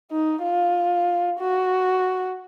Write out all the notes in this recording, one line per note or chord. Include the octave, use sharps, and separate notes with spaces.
D#4
F4
F#4